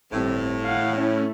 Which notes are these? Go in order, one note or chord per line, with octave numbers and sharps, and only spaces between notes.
G1 A2 G3 C4
F5 F#5
A3 C#4 E4